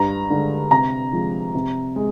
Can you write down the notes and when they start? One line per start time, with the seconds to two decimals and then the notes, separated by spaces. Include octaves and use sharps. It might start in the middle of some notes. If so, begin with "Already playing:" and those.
Already playing: G2 A#5
0.30 D3 G#3
0.71 C3 A#5
1.12 F3 G#3
1.55 C3
1.96 G#3